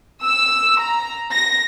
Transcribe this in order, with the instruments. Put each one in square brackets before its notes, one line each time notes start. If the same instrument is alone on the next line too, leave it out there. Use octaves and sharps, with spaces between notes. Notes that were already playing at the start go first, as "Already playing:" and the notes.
[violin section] E6
A#5
A#6